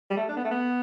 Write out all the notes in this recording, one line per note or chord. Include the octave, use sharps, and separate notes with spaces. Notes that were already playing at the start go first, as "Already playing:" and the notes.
G3
A3
D4
B3
A3
B3